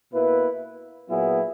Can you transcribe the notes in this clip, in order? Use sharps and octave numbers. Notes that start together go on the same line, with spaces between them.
B2 A#3 E4 B4
A#2 F#3 B3 E4 G#4